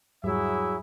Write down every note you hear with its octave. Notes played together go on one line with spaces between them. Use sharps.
E2 G#2 F#3 G3 E4 G#4 E5